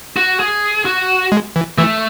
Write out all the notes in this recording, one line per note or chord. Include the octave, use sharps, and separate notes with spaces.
F#4
G#4
F#4
G#3
E3
E3 A3